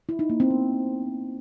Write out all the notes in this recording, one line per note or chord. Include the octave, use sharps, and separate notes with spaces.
E4
D#4
A#3
C4
B3